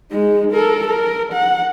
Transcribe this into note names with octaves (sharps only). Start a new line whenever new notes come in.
G#3 D#4
A4 A#4
A#4
F#5